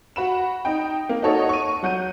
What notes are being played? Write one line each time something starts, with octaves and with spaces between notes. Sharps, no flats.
F#4 B5 E7
D#4 G5
A#3
D#4 F#4 A4 C#5 D#5
C#6 D#7
F#3 F#5 G6 D#7